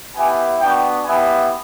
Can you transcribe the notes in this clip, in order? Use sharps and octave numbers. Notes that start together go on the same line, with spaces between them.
B3 E4 G4 G#5
B3 D4 F#4 G5
B3 E4 G4 G#5